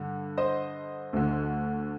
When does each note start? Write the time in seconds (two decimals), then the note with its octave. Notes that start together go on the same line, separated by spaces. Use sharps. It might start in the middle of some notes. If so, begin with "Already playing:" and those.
Already playing: G2 D3
0.38 C5 D#5
1.13 D2 D3